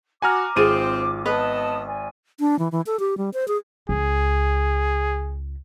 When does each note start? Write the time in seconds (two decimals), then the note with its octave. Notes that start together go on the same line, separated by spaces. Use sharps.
0.22 F#4 G#5 A#5 D6 F6
0.56 G#1 C4 F4 G#4 C5 D#7
1.26 B3 B4 D#5 A5 D#6
1.86 D5 G#5
2.40 D4
2.59 E3
2.72 E3
2.86 A4
3.00 G4
3.18 G3
3.34 C5
3.48 G#4
3.89 C#2 G#4